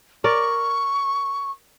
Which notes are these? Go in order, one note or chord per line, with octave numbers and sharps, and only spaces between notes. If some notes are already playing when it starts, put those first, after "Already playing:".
A#4 D5 C#6